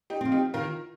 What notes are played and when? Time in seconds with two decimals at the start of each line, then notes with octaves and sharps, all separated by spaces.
0.10 D#4 G4
0.21 F3 C4
0.32 D#4 G4
0.54 D#3 F4 A#4